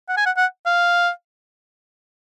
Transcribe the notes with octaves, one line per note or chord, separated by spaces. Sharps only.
F#5
G#5
F#5
F#5
F5